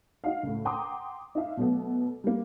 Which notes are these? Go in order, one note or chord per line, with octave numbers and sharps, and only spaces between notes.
D#4 F#4 F5
C#2 A2
F#5 G5 A#5 C6 D6 D#6
D#4 F4 E5 F5
B2 F#3 A3 B3
G3 A#3